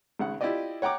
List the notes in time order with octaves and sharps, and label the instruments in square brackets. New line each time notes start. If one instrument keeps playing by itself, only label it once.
[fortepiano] G#1 C#3 F#5
E4 F4 G4 D5 D#5
C#5 F#5 G5 A#5 D6